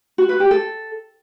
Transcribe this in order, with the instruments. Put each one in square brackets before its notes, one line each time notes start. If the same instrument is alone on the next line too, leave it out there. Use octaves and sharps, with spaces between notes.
[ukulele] F#4
B4
G4
A4